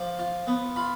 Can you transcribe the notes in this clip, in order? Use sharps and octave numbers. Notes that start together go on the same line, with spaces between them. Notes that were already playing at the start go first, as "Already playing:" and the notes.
Already playing: F3 D6
F4
B3
F4 B5